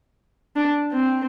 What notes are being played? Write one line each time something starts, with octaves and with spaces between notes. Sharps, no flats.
D4
C4